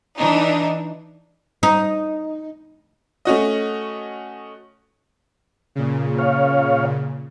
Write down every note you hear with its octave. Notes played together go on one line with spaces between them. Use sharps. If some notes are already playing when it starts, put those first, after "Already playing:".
E3 D4 D#4
D#4
A3 C#4 F#4 D#5
A#2 C#3
C#5 F5